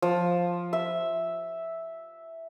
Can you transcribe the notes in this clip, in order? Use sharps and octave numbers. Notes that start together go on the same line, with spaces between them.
F3
E5